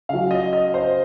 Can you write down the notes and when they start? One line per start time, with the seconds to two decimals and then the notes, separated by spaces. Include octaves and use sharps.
0.09 C#3 F#3 F5
0.31 D#5
0.53 D#5
0.74 C5